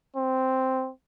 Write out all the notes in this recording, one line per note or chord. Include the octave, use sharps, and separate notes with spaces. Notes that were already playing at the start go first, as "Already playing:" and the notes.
C4